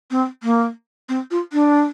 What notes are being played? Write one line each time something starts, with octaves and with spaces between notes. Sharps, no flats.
C4
A#3
C4
F4
D4